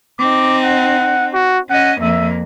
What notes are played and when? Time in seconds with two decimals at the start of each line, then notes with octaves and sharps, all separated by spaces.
0.19 C4 D#4 D6
0.64 F#5
1.34 F#4
1.70 C#4 D#5 F#5
2.01 F2 A#3 E5